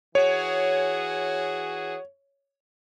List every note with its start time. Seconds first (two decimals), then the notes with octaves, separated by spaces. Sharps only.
0.15 E3 F#4 G#4 C#5